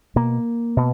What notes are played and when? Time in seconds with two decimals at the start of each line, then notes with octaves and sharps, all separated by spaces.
0.16 B2 A#3
0.77 B2